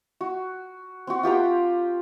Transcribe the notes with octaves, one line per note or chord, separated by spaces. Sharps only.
F#4
C4 F#4
F4 G4 G5 A#5